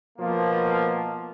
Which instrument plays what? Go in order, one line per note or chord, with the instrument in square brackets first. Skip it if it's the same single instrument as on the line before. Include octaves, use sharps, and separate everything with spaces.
[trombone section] B2 F3 A#3